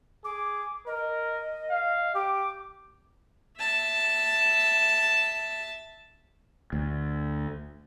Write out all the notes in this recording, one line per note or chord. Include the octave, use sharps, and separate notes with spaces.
G#4 D6
A#4 D#5
F5
G4 D6
E5 A5
D2